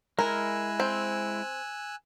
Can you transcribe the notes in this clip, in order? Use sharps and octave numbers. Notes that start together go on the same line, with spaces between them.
G#3 E4 A#4 G#5 E6 F#6
C4